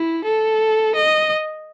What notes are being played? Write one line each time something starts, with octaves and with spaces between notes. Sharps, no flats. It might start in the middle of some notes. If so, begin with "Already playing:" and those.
Already playing: E4
A4
D#5